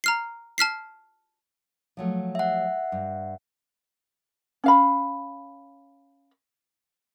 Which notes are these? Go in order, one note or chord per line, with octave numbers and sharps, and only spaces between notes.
A#5 F6 C7
A5 F6 B6 C7
F3 F#3 A3
E5 F#5
G2
C#4 F5 B5